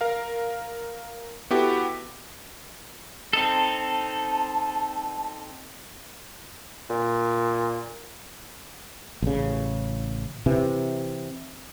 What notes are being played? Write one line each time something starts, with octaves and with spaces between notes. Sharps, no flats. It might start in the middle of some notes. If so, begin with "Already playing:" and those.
A#4 F5
B3 E4 F#4 G4 A4
C4 D#4 A4 A5
A#2
A1 C#3
C3 E3